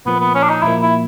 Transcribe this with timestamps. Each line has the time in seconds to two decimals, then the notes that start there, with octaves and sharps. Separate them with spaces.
0.06 A#2 F3 A#3 B3
0.20 B3
0.35 C#4
0.43 D4
0.50 D#4
0.63 A#2 F3 A#3 E4
0.82 E4